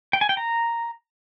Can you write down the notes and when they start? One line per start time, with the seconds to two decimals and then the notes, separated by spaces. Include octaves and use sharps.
0.13 G5
0.21 G#5
0.29 G5
0.37 A#5